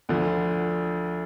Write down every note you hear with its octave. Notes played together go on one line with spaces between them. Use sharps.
D2 D3 F3